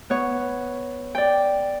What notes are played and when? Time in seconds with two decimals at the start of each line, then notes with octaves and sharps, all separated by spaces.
0.10 B3 C#5
1.15 D5 G5